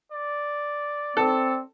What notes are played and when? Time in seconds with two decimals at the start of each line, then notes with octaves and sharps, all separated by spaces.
0.12 D5
1.17 C4 A4